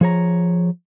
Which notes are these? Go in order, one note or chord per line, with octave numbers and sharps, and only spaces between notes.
F3 G#4 C#5 A#5